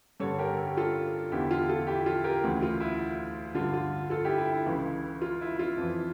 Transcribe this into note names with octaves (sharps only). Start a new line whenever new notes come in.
G2 D3 A4 C#5
G4 A#4
A4
G4
F4 A4
E2 D3 E4 G4
F4
F4 A4
E4 G4
F4 A4
G4 A#4
D2 C#3 E3
F4
E4
G2 D3 F4
F4
F4 A4
E4 G4
E4 G4
E4
C#2 C#3 E3
F4
E4
F4
F2 E3